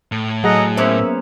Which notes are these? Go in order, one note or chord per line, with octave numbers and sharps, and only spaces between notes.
A2
F#3 G#4 A4 D#5 F#5 A#5
A#3 B3 C#4 C5 E5